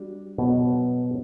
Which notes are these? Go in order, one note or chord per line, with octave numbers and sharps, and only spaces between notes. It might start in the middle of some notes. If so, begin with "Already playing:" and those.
Already playing: G3 D4 F#4
B2 F#3 B3